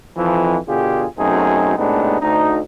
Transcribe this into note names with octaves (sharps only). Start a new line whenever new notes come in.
F2 E3 F3
B2 D3 F4 G4 G#4
F#2 B2 A3 C4 D#4 G#4
A2 C3 G#3 B3 D4 D#4
D2 D#4